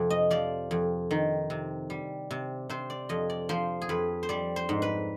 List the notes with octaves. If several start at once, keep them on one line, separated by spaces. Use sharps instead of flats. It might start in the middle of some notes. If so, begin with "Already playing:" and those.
Already playing: F2 C3
D#5
F3 D5
F2
D#3
C3
G3
C3
C3 C5
D5
F2 D#5
D5
F3 C5
G#4
F2 B4
C5
G3 D5
C5
G#2
B4